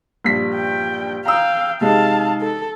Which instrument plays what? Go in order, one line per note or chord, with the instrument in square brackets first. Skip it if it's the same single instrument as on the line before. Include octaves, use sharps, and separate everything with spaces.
[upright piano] A#1 G2 B6
[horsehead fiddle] G5
[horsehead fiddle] F5 G5 [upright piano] A#5 D#6 E6
[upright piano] C3 G#3 D#4 [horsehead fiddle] F5 A5
[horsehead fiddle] A4